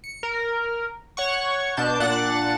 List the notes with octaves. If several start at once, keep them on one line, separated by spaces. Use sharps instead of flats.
C#7
A#4
C#5 F#5 C#6
B2 D4 A5 G6
A#2 D4 F#5 F#6 A6